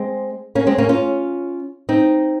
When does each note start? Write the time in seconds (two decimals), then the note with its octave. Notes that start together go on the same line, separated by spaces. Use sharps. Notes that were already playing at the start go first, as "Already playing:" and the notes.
Already playing: G#3 C4
0.55 A#3 C#4
0.67 G#3 C4
0.78 A#3 C#4
0.89 C#4 F4
1.89 C4 D#4